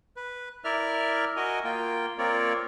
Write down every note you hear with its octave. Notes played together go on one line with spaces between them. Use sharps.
B4
E4 A#4 D5 E5 F6
F#4 A#4 D#5 G#5
A#3 F4 G5
A#3 C4 F4 A#4 C#5 D5